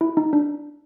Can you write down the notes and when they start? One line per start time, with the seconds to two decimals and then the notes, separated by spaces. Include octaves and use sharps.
0.01 E4
0.17 D#4
0.33 D4